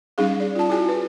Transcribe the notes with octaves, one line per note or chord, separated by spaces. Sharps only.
G3 C#4 D#4 G#4 F5
D5
F4 A5
E4 F#4 G#4 G#5
B4